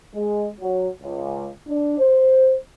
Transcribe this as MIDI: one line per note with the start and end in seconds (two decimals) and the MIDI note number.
0.14 0.48 56
0.61 0.86 54
1.02 1.46 37
1.68 1.98 62
1.98 2.54 72